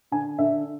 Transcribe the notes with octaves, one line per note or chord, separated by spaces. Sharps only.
D3 G#5
D3 E5